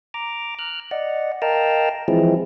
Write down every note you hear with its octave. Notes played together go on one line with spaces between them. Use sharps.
A#5 D6
F6 F#6
D5 D#5 F#5
A#4 D#5 F5 G5 A5 A#5
E3 F3 G#3 C4 E4 G#4